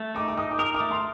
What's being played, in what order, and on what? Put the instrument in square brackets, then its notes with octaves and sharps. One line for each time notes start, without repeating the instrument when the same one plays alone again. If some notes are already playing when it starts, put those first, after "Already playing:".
Already playing: [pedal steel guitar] A3
[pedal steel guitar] D#4 [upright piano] D6
[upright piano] D6
[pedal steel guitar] D#4 [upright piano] D#6
[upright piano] D6
[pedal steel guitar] A#4 [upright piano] D#6
[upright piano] D6
[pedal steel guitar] A3
[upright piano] C6